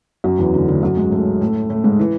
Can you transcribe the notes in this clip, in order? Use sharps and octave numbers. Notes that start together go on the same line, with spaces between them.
F#2 F#3
E2 E3
D2 D3
D2 D3
F#2 F#3
G#2 G#3
A2 A3
A2 A3
A2 A3
G#2 G#3
E3